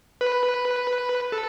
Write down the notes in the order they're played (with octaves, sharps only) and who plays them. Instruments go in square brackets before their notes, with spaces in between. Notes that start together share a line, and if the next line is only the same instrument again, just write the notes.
[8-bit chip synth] B4
A4